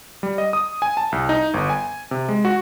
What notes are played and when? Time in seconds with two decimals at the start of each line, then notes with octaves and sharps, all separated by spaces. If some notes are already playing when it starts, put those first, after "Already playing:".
0.23 G3
0.38 D#5
0.53 D#6
0.82 G#5
0.97 A5
1.12 C2
1.29 D#4
1.54 G1
1.70 G#5
2.11 C3
2.29 G#3
2.45 F#4